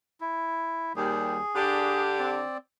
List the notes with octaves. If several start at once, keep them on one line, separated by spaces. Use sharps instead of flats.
E4
D#2 G3 G#4
D3 D4 G4
C4 D5